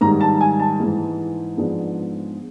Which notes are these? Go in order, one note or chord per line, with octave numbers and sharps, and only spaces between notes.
G#2 D#3 G3 A#5
A5
G#5
A5
G#2 E3 G#3
G#2 F3 G#3 B3 D4